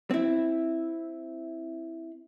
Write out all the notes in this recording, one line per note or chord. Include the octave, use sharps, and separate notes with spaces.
C4 E4